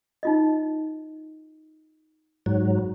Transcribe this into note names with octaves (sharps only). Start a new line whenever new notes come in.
D#4 F4 D#5
G#2 F#3